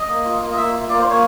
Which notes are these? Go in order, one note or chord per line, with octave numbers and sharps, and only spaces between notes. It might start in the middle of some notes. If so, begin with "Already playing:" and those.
Already playing: D#5
A#3
F4
A#3
D#5
A#3 E5
F4
A#3 D5
C5
A#3
C#5